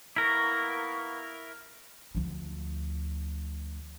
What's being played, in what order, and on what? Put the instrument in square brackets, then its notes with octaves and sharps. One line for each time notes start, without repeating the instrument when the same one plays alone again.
[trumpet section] A#3 B3 C#6 [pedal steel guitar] E4 A#4
[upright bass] D2 F3